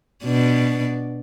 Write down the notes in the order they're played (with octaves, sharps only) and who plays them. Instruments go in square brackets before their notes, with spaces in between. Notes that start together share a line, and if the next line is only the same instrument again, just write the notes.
[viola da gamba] B2 D4